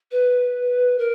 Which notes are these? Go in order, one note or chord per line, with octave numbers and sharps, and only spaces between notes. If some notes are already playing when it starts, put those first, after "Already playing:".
B4
A#4